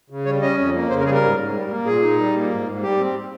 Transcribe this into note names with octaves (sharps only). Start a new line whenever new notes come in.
C#3
G3 C#5
C#4 D#5
F2
A#3
C#3 C5
A#4
G3 G#4
A#4
G#2
G#2
G3
A#3
A#2 G#4
D#4
G3
A#3
G#2
G#2
G3 G4
C4